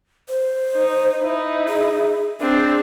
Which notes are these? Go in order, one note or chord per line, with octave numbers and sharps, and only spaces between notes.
C5
D#4
D#4 E4
G#4
C4 D4 G#4